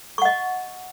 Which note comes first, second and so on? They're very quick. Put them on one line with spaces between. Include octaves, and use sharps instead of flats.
C#6 F#5 D#5